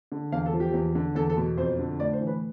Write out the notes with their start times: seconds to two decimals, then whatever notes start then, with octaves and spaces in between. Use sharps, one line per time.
0.12 D3
0.32 E2 F5
0.46 A4
0.53 F3
0.60 G4
0.73 E2
0.95 D3
1.15 E2 A4
1.30 A4
1.37 B2
1.57 F2 C5
1.78 D3
2.00 A2 D5
2.13 C5
2.21 E3
2.27 B4